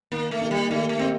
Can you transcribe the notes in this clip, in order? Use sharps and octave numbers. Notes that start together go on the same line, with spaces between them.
D#3 A#3
A3
A#3 D#4 G4
G3
D#3 A3
A3
A#3 C4 D#4 G4